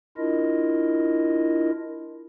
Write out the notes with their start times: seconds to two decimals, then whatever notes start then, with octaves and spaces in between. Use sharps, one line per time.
0.17 D4 E4 F4 A#4 D#5